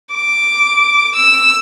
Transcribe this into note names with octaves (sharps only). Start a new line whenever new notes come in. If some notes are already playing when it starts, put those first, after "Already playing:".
D6
E6